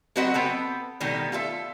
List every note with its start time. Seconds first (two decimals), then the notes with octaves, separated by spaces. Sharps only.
0.16 F#3 C4 F#4 B4 D#5 F#5
0.34 B3 C4 A4
1.00 B2 D#3 G3 A3 B3
1.32 F4 A4 A#4 E5